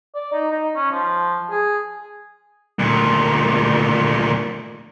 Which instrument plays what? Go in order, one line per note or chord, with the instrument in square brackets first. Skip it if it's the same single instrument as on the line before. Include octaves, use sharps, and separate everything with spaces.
[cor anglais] D5
D#4
D#4
C#4
F3
G#4
[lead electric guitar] D2 A#2